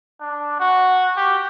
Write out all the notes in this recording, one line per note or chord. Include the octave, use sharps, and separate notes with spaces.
D4
F#4
G4